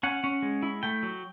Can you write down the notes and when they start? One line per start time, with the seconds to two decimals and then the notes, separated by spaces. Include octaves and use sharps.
0.03 C#4 F#5
0.24 C#4
0.42 G#3
0.63 E4
0.83 A3 G5
1.03 F#3